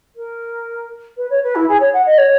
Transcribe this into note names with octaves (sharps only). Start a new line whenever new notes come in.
A#4
B4
C#5
B4
E4
G#4
C#5
F#5
D#5
C#5